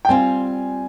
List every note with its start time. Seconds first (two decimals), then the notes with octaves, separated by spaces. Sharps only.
0.05 G5
0.09 G3 C4 F4 G#5